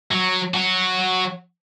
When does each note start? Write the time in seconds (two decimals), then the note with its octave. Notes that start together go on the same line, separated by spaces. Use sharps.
0.11 F#3
0.54 F#3 F#4